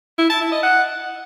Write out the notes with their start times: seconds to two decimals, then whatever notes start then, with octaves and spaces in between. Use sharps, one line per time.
0.18 E4
0.30 A5
0.41 E4
0.52 D#5
0.63 F#5